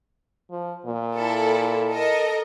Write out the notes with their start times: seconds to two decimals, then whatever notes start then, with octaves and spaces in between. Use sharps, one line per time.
0.51 F3
0.85 A#2
1.17 E4 A4
1.90 A4 A#4 D#5